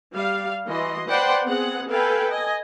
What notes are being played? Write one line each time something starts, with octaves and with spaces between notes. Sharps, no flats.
G3 F5
E3 F#4 D#5 C6
B4 C5 D5 F#5 G5 C6
B3 C4 G#4 F#5
A4 B4 F5 G5 G#5
D#5 G#5